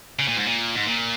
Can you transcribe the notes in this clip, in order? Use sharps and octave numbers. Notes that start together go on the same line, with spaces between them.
C#3
A#2
G#2
A#2
G#2
A#2